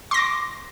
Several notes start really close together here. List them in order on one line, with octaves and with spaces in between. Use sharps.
C6 A#6 D6